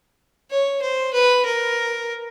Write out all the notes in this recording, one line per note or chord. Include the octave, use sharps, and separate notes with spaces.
C#5
C5
B4
A#4